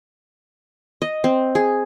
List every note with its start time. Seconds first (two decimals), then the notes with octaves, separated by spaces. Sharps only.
1.02 D#5
1.24 C4
1.55 G#4